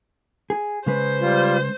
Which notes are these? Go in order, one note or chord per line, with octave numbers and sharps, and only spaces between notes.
G#4
C#3 G#3 B4 C5
G3 F4